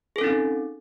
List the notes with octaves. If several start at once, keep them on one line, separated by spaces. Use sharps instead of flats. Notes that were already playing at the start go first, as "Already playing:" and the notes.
C4 C#4 D#4 G#4 A4